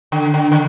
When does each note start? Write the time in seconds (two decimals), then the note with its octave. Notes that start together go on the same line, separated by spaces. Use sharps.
0.12 D3
0.34 D3
0.52 D3